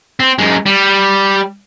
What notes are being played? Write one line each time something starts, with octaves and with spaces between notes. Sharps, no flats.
C4
F#2 G#3
G3